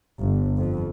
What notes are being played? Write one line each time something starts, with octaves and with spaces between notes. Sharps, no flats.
G1
F2